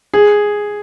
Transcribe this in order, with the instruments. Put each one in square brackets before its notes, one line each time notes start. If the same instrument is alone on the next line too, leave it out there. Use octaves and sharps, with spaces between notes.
[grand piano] G#4